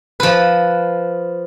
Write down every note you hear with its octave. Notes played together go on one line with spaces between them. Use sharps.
F3 B4